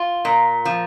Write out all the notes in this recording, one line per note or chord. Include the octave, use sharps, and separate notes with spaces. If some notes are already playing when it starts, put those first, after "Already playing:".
Already playing: F4
A#2
F3